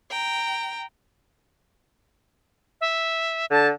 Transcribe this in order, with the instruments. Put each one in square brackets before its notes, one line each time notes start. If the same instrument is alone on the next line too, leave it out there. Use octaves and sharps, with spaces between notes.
[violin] G5 A#5
[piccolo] E5
[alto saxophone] D3 [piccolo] A5